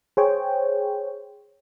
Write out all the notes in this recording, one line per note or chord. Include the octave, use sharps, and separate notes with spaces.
G#4 C5 C#5 G5